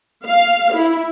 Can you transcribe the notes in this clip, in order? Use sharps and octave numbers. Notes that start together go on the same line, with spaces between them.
F5
E4